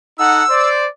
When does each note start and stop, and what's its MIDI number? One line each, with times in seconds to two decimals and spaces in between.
0.19 0.42 63
0.19 0.42 69
0.19 0.42 78
0.19 0.69 88
0.49 0.85 72
0.49 0.85 74